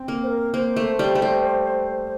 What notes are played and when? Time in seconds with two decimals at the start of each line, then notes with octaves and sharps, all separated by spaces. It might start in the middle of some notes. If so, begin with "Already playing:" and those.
Already playing: C4
0.08 A#3
0.23 C5
0.27 A#4
0.54 A#3 C5
0.76 A3
0.99 G3
1.15 A3
1.22 G3